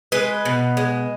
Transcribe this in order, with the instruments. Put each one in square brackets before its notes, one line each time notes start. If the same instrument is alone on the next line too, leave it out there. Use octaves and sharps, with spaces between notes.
[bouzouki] G#3 B4 D#5
B2
G#3